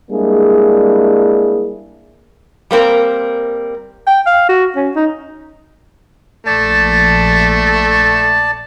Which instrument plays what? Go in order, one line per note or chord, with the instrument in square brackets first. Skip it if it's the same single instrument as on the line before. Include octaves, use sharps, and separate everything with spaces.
[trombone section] G3 G#3 A#3 D4 E4 G#4
[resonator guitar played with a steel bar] G3 A#3 C4 A#4
[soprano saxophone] G5
F5
F#4
C#4
D#4
[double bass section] A#1 [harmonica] A3 [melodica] D5 A5